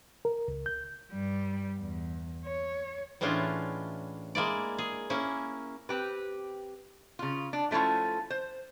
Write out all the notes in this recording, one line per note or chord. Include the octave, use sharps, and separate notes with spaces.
A#4
C#2
G6
G2 G3
E2
C#5
A2 E3 G#3 C#4 D4 F4
G#3 A#3 E4 D5
G#4
A#3 C#4 E4
C4 G4 B4
C#3 F4
D4
F3 A3 C#4 E4 F4
C5